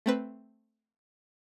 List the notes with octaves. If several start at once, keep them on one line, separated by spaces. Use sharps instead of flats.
A3 C4 B4